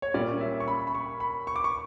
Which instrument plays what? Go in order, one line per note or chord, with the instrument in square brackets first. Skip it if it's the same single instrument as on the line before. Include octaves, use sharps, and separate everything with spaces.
[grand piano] C#5
[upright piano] A#2 G3 C#4 [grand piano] D5
[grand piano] E5
C#6
B5
B5
C#6
B5
C#6
D6
C#6